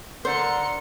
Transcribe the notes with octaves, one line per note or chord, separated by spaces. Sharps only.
D3 A#4 C5 C6 C#7